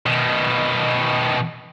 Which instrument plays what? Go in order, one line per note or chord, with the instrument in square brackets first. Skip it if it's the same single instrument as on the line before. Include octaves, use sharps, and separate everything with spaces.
[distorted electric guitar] B2 D#3